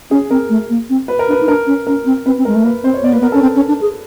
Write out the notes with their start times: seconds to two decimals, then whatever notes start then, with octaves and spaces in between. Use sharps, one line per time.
0.11 C#4 G#4
0.30 C4 A#4
0.49 A3
0.70 A#3
0.90 C4
1.08 B4
1.19 A#4
1.28 D4 B4
1.41 D#4
1.48 D4 A#4
1.67 C#4
1.87 C#4 A#4
2.05 C4
2.26 C4 B4
2.38 C4
2.45 G#3 A#4
2.55 A3
2.64 A#3 B4
2.84 C4 C5
2.94 C#5
3.03 B3 D5
3.13 A#3 B4
3.20 B3 A#4
3.32 C#4 A4
3.42 C4
3.56 C#4
3.68 D4
3.81 G#4